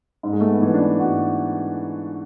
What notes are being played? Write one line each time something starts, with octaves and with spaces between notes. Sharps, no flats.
G#2
G#3
A3
B3
E3
D4
G#2 F#4